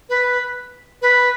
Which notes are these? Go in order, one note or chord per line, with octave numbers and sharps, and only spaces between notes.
B4
B4